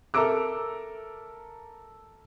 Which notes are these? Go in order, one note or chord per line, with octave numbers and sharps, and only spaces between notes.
A4 A#4 E5 A#5 D6 E6